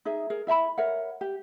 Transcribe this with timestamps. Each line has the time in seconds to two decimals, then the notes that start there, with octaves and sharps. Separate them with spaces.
0.05 D#4 G#4 E5
0.30 G#4 A#4
0.47 E4 E5 A5 B5
0.78 A#4 C#5 E5 F#5
1.21 G4